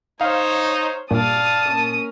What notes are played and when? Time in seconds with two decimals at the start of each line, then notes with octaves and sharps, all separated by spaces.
0.21 D#4 C5 C#5 F5
1.11 G2 A#2 D5 F5 A5 D#6
1.69 A#3 C#4